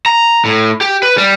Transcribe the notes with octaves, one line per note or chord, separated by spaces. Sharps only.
A#5
A2
G4
B4
G3